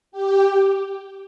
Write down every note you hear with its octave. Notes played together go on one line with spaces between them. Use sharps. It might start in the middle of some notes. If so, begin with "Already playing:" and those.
G4